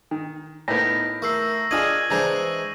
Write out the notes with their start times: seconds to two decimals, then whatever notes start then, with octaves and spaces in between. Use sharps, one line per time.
0.11 D#3
0.68 A2 A#3 B3 D#4 G6 A#6
1.22 A3 A#4 C#6 E6 C7
1.71 D4 F4 G#4 D#5 G#6 D#7 F#7
2.10 E3 G#3 D4 G#4 C5 A#5